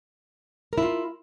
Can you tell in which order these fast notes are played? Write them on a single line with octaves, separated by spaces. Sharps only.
A#4 E4 F4